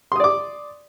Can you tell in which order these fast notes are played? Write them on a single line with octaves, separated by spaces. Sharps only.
C6 D#6 D5 D6